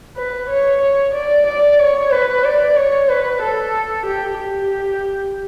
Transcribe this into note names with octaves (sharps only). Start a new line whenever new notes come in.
B4
C#5
C#5
D5
D5
C#5
B4
D5
C#5
B4
A4
G4
G4